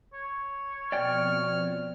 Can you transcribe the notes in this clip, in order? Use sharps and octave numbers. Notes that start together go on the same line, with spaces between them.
C#5
B2 F3 C4 D5 G5 F6